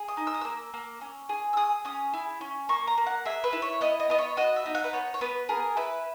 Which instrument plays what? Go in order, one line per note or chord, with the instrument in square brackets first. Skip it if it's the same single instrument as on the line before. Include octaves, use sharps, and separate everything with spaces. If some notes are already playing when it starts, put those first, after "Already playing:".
Already playing: [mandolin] G#4
D#6
D#4
E6
D#6
A#3 E6
A#3
C#4
G#4
E6
G#4 D#6
C#4 D#6
E4
C#4
A#3 C#6
A#5
A#3
F#5
G#4 E5
B4
E4
C#5
B3 D#5
D#5
B3 D#5
C#5
F#4 D#5
E5
D#4
F#5
B4
B3 C#5
C#5
B3 B4
G#4 A#4
E4 B4